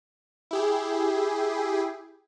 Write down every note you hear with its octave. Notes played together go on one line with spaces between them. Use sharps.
E4 G4 G#4